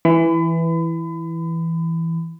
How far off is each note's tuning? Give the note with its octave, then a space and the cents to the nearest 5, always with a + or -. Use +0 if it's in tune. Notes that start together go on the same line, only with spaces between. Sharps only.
E3 +0 B5 +35